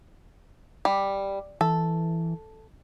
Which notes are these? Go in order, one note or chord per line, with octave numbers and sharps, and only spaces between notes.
G3
E3 A4